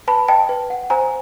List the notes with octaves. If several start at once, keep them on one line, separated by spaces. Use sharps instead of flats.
B4 A5 B5
D#5 G5 A5
B4
F#5
C5 G#5 A#5